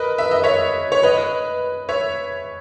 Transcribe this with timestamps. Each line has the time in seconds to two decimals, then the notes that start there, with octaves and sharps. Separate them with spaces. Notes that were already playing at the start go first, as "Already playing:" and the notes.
Already playing: A#4 B4 D#5
0.18 E5
0.31 D#5
0.44 C#5 E5
0.92 C#5
1.03 B4 D#5
1.89 C#5 E5